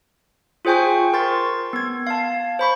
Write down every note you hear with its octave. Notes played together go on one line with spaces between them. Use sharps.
F4 G#4 C5 G5 G#5 C#6
A#4 C6 C#6 A6
B3 G#6
F5 A5
C5 B5 C#6